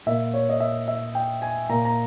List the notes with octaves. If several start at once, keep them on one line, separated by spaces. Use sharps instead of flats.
A#2 E5
C#5
D#5
E5
E5
G5
G#5
A#2 A#5
A#5